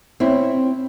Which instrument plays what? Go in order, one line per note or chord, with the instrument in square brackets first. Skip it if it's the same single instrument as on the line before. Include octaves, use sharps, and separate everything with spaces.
[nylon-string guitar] C4 C#4 E4